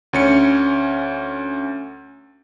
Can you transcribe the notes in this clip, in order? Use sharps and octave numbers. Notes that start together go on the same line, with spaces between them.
D2 C#4 C#7